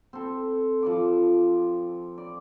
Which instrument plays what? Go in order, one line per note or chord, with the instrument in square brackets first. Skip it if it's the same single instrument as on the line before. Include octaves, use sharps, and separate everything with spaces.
[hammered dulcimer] C4 A4
F3 D5 D6
D5